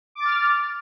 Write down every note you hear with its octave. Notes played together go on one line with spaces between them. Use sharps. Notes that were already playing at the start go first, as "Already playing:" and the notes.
D6 F6 A6